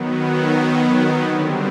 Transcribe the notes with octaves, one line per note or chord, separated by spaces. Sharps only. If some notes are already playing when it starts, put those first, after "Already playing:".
Already playing: D#3 F#3 B3
D3 G3 C4